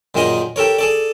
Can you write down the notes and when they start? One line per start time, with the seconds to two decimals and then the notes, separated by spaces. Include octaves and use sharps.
0.15 F#2 A#2 D#3 G#4 A#4 D#5
0.56 G4 A4 A#4 C#5
0.78 G#4 A4 D5